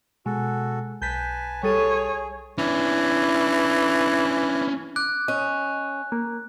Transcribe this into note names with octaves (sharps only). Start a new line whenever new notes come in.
B2 G#3 F#4 A4
B1 B4 G#5 A5 G6 B6
G3 G#4 A4 C#5 D#7
E3 C#4 D4
D6 F#6
C#4 D#5
A#3